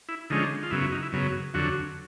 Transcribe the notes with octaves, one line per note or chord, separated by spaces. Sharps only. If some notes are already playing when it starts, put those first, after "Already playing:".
E4
D3 F3 G#3 C#4 D#4
F4
F#2 C#3 F#3 B3 E4
E4
D#4
E4
F#2 C#3 F#3 B3
F2 D3 F#3 F#4